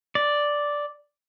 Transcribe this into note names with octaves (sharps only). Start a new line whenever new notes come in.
D5